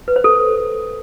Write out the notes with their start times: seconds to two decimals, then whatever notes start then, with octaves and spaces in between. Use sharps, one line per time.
0.08 B4
0.16 C5
0.24 A4